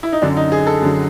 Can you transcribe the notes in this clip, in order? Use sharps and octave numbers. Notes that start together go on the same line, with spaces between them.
E4
D#4
F#2 D3 F#3 D4
D#4
G#4
A4
F#2 D3 F#3